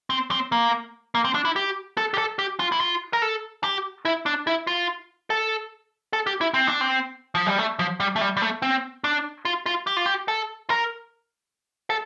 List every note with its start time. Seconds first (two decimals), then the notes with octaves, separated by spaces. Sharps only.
0.10 C4
0.31 C4
0.52 A#3
1.15 A#3
1.25 C4
1.35 D4
1.45 E4
1.56 G4
1.97 A4
2.14 G4
2.18 A4
2.39 G4
2.60 F4
2.72 E4
2.80 F4
3.13 A#4
3.22 A4
3.64 G4
4.05 E4
4.26 D4
4.47 E4
4.67 F4
5.30 A4
6.13 A4
6.27 G4
6.41 E4
6.54 C4
6.67 D4
6.81 C4
7.35 F3
7.46 G3
7.58 A3
7.79 F3
8.00 G3
8.16 A3
8.21 G3
8.37 G3
8.42 A3
8.62 C4
9.04 D4
9.45 F4
9.66 F4
9.87 G4
9.96 F4
10.06 G4
10.28 A4
10.70 A#4
11.90 A4